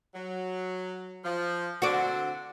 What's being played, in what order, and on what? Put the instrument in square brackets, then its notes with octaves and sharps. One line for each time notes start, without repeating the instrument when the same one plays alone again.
[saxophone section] F#3
F3
[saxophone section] D3 C4 D4 [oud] F#4 D5